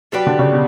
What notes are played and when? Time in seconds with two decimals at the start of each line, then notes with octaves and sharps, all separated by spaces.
0.12 F#3 G3 D4 G4 B4
0.27 D3
0.39 C#3
0.52 B2